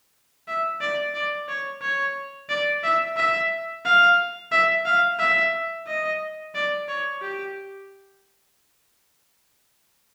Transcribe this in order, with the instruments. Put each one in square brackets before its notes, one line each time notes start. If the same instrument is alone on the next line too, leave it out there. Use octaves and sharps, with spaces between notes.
[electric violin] E5
D5
D5
C#5
C#5
D5
E5
E5
F5
E5
F5
E5
D#5
D5
C#5
G4